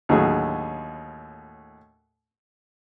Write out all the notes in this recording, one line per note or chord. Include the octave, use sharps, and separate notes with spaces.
D#2 A2 D3 F#3 G#4